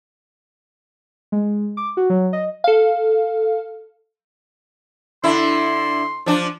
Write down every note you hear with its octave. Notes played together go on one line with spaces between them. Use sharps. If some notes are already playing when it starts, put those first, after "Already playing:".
G#3
D6
F#4
F#3
D#5
A4 F5
D3 E4 C6
F3 D4